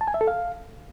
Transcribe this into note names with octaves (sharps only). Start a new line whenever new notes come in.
A5
G#5
E5
A4
F5